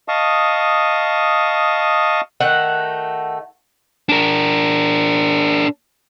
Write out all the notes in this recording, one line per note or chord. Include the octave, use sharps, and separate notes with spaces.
D#5 F5 A5 C#6 D#6
D#3 A3 F#4 F#5
D4 A#4